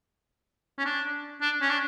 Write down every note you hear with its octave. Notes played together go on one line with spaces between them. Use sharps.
C#4
D4
D4
C#4
D4